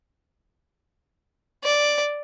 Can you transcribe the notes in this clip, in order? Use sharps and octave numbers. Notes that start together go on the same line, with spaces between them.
D5